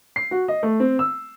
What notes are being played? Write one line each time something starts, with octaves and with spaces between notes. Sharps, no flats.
C7
F#4
D#5
A3
C4
E6